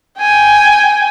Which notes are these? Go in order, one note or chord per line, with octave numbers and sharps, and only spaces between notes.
G5 G#5